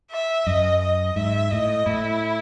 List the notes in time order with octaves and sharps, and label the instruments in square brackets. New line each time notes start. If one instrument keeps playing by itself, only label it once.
[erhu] E5
[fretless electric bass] F#2 [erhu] D#5
[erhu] D#5
[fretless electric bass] G#2 [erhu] E5
[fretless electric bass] A2 [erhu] D#5
[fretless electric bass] A2 [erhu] E4